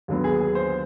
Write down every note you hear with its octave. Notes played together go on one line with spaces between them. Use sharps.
D#2 D3 F#3 B3
G#4
G#4
C5